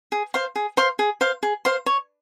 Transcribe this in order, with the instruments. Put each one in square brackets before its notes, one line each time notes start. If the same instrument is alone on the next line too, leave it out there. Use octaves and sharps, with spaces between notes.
[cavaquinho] G#4
C5 F5 C6
G#4
C5 F5 C6
G#4
C5 F5 C6
G#4
C5 F5 C6
C#5